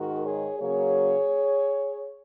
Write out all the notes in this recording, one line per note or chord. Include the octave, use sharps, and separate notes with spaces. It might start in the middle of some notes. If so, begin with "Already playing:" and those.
Already playing: G#2 D#3 G#3 F#4 A#4
G#4 C#5
C#3 F#3 A#3 C#4 G#4 C#5